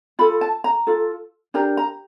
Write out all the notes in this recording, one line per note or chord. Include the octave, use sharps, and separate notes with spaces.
F4 A4 B5
A5
A#5
F4 A4
D4 G4 A#4 A#5
A#5